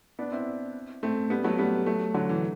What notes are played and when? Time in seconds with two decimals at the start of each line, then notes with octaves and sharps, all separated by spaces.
0.19 B3 D4
0.32 C4 E4
1.03 A3 C4
1.30 G3 B3
1.44 F#3 A3
1.58 G3 B3
1.86 F#3 A3
2.14 D3 F#3
2.29 E3